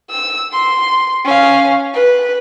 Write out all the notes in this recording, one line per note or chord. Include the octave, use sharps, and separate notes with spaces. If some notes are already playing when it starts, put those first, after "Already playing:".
E6
C6
C#4 F5
B4